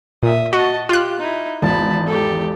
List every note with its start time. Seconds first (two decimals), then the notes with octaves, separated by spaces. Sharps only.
0.23 A#2 E5 D#6
0.53 F#4 D#5 A5
0.89 F4 G4 F#6
1.20 D#4 E4
1.62 G#1 E2 A5 B5
2.06 G4 A4